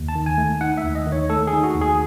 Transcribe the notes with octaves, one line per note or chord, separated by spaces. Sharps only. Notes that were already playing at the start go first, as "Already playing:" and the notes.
Already playing: D#2
A5
D#3
G#5
A3
D#4 F#5
E5
D#2
D#5
D#3
C#5
A3 A4
G#4
D#4
F#4
D#2
G#4